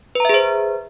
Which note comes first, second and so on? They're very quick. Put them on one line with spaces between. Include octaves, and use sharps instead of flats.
B4 A#5 E5 G#4 C5